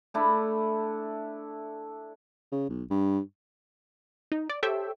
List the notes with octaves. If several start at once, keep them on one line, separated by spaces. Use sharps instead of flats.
A3 D4 E4
C#3
B1
G2
D#4
D5
G4 A4 C5 C#5 E5 G5